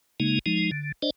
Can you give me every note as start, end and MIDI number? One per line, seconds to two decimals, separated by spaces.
0.20 0.39 49
0.20 0.39 56
0.20 0.39 58
0.20 0.39 63
0.46 0.71 53
0.46 0.71 56
0.46 0.71 63
0.72 0.92 50
1.02 1.10 62
1.02 1.10 72
1.02 1.10 74
1.02 1.10 75